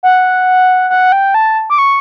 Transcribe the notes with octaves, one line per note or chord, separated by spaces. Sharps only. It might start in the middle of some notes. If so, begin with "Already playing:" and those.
F#5
F#5
G5
A5
D6
C#6